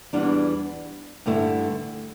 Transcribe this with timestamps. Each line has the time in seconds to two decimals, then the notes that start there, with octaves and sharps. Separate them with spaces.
0.13 E2 E3 G3 D4
1.26 G2 D3 A3 E4